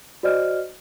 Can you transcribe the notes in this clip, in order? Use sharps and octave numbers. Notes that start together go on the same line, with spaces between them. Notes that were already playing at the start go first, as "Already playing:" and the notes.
F#4 C5 D5 D#5 F6